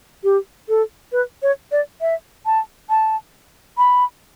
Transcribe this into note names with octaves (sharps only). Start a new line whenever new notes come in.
G4
A4
B4
C#5
D5
E5
A5
A5
B5